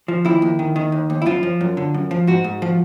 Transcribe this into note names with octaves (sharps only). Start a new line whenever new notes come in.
F3
D#2 E4
D#2
D#3
D#3
D#2
D#2
E4
F#2 F4
F3
F#2
D3
F#2
F3
G#2 F#4
G#2
F3